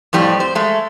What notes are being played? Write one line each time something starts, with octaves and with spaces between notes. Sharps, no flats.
F2 A2 G3 C4
C5
G#3 A3